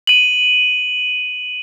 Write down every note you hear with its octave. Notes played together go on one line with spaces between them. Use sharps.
D#7 F#7